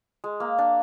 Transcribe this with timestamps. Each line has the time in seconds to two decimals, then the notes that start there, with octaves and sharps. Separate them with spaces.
0.24 G#3
0.40 A#3
0.58 D4